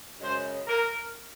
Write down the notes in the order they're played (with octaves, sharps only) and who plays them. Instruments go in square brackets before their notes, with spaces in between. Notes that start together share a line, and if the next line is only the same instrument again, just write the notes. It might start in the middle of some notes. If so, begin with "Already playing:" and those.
[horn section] F#2 C#3 G#3 C5
A#4